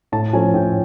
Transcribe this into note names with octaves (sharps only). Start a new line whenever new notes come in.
A2 A5
F3 A3 C#4 G#5
A2 G5